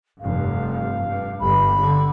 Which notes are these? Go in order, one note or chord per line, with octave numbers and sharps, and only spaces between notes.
F1 G2 F5
G2
G1 G2 B5
D3